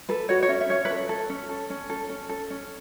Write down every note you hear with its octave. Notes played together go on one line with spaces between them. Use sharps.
A4 B4
F#4 C#5
C#5
C#4 E5
E5
C#4 C#5
B4
A4 C#5
A4
C#4
A4
C#4
A4
C#4
A4
C#4